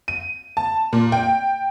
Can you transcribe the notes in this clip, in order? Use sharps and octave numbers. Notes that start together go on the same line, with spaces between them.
D#7
A5
A#2
G5